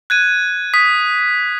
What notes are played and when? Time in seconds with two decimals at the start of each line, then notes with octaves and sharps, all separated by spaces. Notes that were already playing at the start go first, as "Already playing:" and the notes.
0.10 F#6 G#6 D#7
0.74 D#6 B6